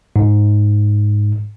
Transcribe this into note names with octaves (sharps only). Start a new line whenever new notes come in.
G#2